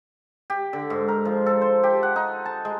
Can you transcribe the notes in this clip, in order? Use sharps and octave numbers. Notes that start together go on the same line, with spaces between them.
G4
D3
G#2
A#4
F3
A4
C5
G4
F#5
D#4
A5
G#3